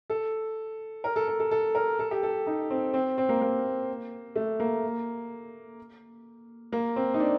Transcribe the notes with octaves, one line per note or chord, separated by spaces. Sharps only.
A4
A#4
A4
A4
A4
A4
A#4
A4
G4
A4
D#4
C4
C4
C4
A#3
A#3
A3
A#3
A#3
C4
D#4
D4